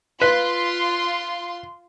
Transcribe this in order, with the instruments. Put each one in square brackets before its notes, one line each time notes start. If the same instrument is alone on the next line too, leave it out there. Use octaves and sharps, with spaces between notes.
[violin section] F4 C6 [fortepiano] B4